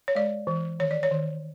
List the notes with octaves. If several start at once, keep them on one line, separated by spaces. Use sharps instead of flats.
C#5
G#3 D5
E3
D#3 C#5
D5
C#5
D#3